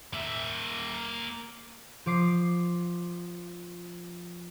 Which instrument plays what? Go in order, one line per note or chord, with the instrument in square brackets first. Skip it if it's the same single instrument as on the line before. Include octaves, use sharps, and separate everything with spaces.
[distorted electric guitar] A#3 E5
[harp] F3 D6 C7